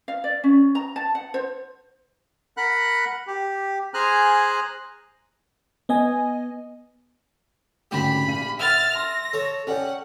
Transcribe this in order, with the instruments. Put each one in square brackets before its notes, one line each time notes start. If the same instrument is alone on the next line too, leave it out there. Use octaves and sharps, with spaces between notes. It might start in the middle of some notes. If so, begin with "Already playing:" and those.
[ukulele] F5
D5
C#4
A#5
A5
F#5
C5
[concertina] A#4 F#5 B5 F#6
G4
G#4 C5 G#5 A#5 F6 F#6
[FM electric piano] B3 D#5 G#5
[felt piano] G#1 D2 C#3 [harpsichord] G4 [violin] B5
[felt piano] A#1 F5 D#7
[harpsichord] E5 [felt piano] F#5 [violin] F6 A6
[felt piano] C6 [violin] A#6
[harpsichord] A4 C#5
[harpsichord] C#4 [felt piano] A4 D5 G5 [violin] F#5